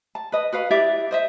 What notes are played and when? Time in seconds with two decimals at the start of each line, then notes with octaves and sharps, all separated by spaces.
0.15 A5
0.32 B4 D#5
0.52 F#4 B4 F5
0.71 E4 G4 D5 E5
1.11 C5 D#5 E5